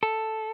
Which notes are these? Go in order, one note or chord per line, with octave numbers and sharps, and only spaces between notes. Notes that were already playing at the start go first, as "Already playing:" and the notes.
A4